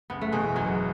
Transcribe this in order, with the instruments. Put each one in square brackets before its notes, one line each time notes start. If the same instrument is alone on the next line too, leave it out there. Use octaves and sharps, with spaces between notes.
[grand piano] F#1 [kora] B3
[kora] A3
[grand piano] E2 B2 [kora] G#3
[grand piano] F#1 [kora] F#3